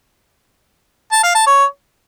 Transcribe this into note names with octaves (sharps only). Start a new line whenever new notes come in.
A5
F5
A5
C#5